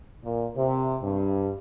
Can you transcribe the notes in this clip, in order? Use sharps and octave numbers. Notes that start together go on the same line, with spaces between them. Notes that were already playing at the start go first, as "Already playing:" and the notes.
A#2
C3
G2